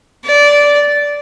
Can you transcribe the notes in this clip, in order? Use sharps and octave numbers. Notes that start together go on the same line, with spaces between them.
D5